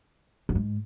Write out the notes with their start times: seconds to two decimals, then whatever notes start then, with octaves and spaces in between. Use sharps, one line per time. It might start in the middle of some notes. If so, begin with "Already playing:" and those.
0.49 F#2
0.55 G#2